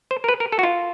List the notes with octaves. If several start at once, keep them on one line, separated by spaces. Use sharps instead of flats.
C5
A#4
B4
A#4
A4
F#4
F4